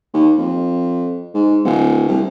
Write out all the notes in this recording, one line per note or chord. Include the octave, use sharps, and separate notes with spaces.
D#2
F2
G#2
D1
C2